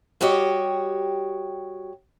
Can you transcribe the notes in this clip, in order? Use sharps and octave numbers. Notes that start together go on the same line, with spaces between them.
G3 F#4 G4 C#5 D#5